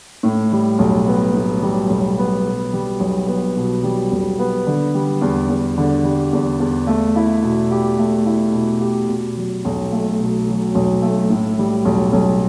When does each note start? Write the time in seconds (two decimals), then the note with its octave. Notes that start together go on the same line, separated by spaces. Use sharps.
0.23 A2
0.52 G3
0.79 B1
1.07 B3
1.34 A2
1.62 G3
1.89 B1
2.18 B3
2.45 B2
2.73 G3
3.00 B1
3.28 B3
3.56 B2
3.83 G3
4.12 B1
4.39 B3
4.67 D3
4.94 G3
5.21 E2
5.49 E2
5.78 D3
6.04 G3
6.33 E2
6.60 E2
6.87 A3
7.16 E4
7.43 B2
7.71 G4
7.99 A3
8.26 E4
8.53 B2
8.81 G4
9.09 B2
9.37 F#3
9.65 B1
9.92 A3
10.20 B2
10.48 F#3
10.75 B1
11.02 A3
11.30 A2
11.58 G3
11.85 B1
12.13 B1